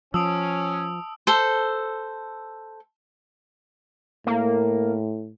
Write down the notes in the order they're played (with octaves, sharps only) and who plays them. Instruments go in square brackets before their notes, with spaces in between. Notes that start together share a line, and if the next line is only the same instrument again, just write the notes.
[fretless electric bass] F3 [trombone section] C#4 [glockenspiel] A5 D7 [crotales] D#6 E6
[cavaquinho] A4 C5
[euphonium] A2 [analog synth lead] A#3